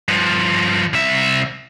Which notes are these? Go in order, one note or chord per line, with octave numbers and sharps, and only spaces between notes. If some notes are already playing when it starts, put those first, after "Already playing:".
G2 F3
C2 E5